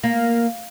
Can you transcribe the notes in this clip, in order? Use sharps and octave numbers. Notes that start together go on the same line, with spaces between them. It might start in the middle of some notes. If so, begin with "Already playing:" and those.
A#3